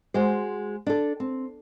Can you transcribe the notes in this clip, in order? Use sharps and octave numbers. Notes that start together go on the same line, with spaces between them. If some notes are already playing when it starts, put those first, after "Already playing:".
G#3 F#4 C5
D4 A4
C4